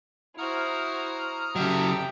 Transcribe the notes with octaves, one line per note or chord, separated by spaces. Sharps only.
E4 F#4 C5 A#5 D#6 F6
C#3 F#3 G4 A4 E5